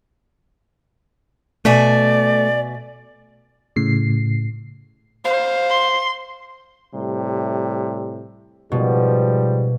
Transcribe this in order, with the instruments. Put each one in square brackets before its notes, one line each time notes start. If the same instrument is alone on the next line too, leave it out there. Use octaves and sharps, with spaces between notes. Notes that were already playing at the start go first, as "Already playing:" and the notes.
[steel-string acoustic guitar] B2 E5 G#5 [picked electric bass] A3 [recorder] D5
[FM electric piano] A2 C#3 C7
[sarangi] C5 [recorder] F5
[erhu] C6
[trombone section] A2 C3 G3
[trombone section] G#2 F3 G3 [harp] B2